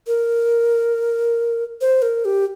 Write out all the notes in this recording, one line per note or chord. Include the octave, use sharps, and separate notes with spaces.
A#4
C5
A#4
G4